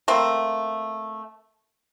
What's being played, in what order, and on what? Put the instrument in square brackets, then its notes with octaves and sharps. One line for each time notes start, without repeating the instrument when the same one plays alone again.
[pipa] A3 A#3 C4